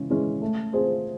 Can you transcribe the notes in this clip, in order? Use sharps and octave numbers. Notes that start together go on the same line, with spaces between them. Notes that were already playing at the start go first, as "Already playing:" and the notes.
Already playing: C#3 E3 G#3 C#4
E3 G#3 C#4
A3
C4 F4 G#4 C5